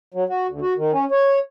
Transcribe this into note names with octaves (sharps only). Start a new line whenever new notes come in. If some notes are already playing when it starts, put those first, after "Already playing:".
F#3
F#4
D2
F#4
D#3
C#4
C#5